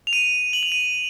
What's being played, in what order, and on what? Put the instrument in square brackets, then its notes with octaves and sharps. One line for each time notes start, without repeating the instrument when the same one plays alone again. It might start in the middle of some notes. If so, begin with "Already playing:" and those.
[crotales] F7
D#7
F#7
F7
D#7